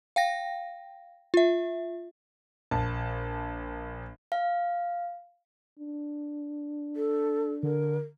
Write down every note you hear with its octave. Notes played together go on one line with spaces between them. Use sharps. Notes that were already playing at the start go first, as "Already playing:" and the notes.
F5 G5 A#6
F4 E5
A#1 A5
F5
D4
A4
D3 A#4